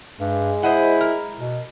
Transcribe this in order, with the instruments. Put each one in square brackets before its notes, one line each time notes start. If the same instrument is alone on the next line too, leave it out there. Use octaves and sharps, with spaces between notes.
[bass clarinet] G2 [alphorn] G#3
[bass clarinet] E4 [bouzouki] C5 D#5 F#5
[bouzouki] A#4
[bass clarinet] B2